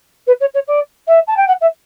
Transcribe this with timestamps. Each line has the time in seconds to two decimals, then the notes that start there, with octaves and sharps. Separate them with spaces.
0.27 B4
0.40 C#5
0.54 C#5
0.67 D5
1.07 E5
1.27 A5
1.37 G5
1.47 F#5
1.61 E5